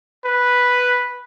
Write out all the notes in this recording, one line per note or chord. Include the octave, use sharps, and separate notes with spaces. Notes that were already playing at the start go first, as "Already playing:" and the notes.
B4